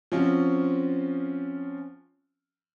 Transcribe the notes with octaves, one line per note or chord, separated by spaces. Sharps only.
F3 C4 C#4 F4 F#4